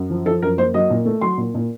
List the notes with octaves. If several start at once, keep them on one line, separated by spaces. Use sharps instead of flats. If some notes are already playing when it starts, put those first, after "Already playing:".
Already playing: F#2
F3
F3 A4
F#2 A#4
A#3 C5
F#3 D#5
A#2
A3
F#3 C6
A#2
A#2